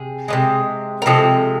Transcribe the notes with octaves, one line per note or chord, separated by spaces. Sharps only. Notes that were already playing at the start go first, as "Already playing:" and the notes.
Already playing: C3 G#4
C3 F3 G#3
A#4
C3 F3 G#3 A4